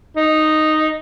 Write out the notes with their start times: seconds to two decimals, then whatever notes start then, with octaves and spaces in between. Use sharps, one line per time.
0.17 D#4